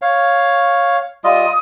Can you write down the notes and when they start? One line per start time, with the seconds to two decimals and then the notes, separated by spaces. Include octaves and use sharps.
0.02 C#5 F5
1.24 G3 F4 D#5 D#6